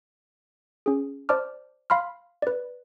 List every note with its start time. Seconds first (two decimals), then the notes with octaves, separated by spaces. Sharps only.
0.86 C#4 G#4
1.29 C5 D5 A5 D6 F6
1.90 F5 B5 C6 F6
2.42 B4 D5